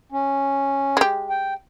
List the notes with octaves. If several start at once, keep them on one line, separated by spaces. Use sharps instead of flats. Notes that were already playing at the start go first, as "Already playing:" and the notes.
C#4
G#3 G4
G5